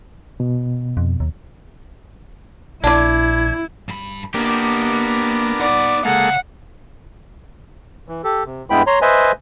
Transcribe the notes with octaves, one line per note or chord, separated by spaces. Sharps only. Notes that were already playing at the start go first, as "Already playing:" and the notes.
B2
F2
D#2
A#1 D4 E4 D5 G#6
G2 B5
A#3 B3 D4 G4 A#4
D#4 D5 F#5
C#3 G#3 A#3 A4 F5 F#5
E3
G4 A4
C3
G2 G#3 B3 E4 G5 B5
C#5 A#5 C6
B4 C5 D#5 E5 G#5